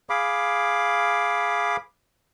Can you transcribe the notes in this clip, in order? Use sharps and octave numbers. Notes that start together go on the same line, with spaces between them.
G#4 F5 B5 D6